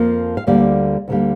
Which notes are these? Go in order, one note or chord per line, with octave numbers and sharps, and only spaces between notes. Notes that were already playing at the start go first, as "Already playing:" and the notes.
Already playing: F2 F3 A#3
F5
D2 D3 G3 A#3 D5
D2 D3 G3 A#3